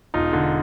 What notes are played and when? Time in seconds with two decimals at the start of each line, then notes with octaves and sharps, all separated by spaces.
0.14 E1 D#4 F4
0.33 D3